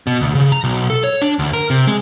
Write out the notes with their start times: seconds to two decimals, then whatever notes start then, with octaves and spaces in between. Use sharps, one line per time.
0.07 B2
0.20 D2
0.35 C#3
0.52 A#5
0.64 B1
0.90 A4
1.04 C#5
1.22 D4
1.39 D2
1.53 A#4
1.70 C3
1.87 G#3